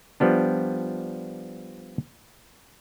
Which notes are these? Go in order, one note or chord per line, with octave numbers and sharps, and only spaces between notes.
F3 G3 B3 D4